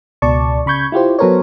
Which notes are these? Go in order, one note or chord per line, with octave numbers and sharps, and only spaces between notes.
C#2 B2 D5 A5 C#6
C#3 B5 C#6 G6 G#6
E4 F4 G4 C5
F#3 B3 A4 A#4 C5 C#5